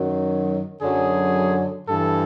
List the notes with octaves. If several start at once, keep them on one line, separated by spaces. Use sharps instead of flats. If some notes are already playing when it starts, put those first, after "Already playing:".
Already playing: F#2 D#3 F#3
F#2 D3 F#3 G#4
G2 E3 A4